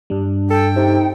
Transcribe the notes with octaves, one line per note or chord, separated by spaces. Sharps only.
G2 G3 D4
A4 G5
C3 D#4